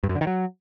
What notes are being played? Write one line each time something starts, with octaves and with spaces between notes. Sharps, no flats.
G2
F#2
D3
D#3
F#3